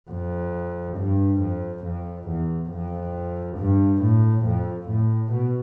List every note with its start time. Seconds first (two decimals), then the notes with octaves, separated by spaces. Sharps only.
0.10 F2
0.98 G2
1.41 F2
1.85 F2
2.28 E2
2.71 F2
3.58 G2
4.02 A2
4.46 F2
4.89 A2
5.32 B2